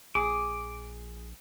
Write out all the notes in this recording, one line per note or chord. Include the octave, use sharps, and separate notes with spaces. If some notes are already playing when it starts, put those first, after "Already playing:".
A#1 G#4 D6